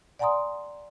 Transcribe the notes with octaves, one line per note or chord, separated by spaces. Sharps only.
D5 F#5 G#5 A#5 C6 D#6